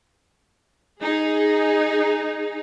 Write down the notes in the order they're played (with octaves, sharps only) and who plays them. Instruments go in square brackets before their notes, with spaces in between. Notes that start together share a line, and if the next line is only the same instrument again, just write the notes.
[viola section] D#4 G#4